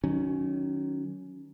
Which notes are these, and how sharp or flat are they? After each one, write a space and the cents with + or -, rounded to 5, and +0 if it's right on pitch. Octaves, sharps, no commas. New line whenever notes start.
D#3 -15 F#3 +0 C#4 +10